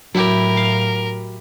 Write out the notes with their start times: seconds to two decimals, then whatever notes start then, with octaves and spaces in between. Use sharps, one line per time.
0.15 A2 F#3 E4 G4 A#4
0.57 F5